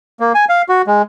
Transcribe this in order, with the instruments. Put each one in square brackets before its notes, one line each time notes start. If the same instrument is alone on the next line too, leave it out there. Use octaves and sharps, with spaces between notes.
[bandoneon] A#3
G#5
F5
F#4
G#3